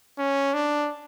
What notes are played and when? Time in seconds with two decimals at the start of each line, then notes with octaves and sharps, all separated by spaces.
0.18 C#4
0.54 D4